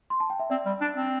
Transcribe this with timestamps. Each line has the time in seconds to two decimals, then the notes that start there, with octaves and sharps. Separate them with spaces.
0.10 C6
0.20 A5
0.30 G5
0.40 E5
0.50 C4 D5
0.66 G3
0.81 D4
0.96 C4